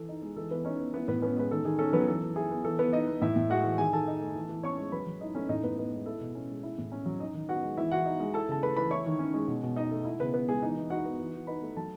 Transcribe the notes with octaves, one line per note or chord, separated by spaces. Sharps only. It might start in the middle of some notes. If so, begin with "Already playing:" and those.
Already playing: E3 A4
D#4
G#3
E3 A4
E3 B3 B4
C#4 D#4 C#5
B3
B3 E4 B4
A2 B3 B4
B3 C#4 B4
G#3 B4
D#3 A4
D#3 G#4
C#4 A4
F#3 B3 B4
E3 A4
E3
E4 G#4
B3
E3 A4
E3 B3 B4
D#4 D#5
B3
A2 E4 E5
A2
G#3 F#4 F#5
E3
D#3 G#4 G#5
D#3 A4 A5
D#4
A3
E3
E3
C#4 C#5 C#6
G#3
F#3 B4 B5
F#3
D#4 E4 D#5
A3 C#4 C#5
A2 D#4 D#5
A2 B3 B4
B3 D#4 B4
G#3
E4 A4
B2
C#4
G#3
E4
A2
C#4
F#3
D#4 D#5
D#3
B3 F#4 F#5
G#3
E3 E4 E5
E3 F#4 F#5
D#4
G#3
E4 A4 A5
C#3 A5
A3 B4 B5
E3 B4 B5
E4 C#5 C#6
D#3
C#4
G#3
B2
B2
D#4 D#5
A3
E4
C#3 B3 B4
B3 B4
G#3 G#4
E3 D#4 D#5
E3
D#4 F#4 F#5
B3
E3
E3
D#4 B4 B5
A3
F#3 A4 A5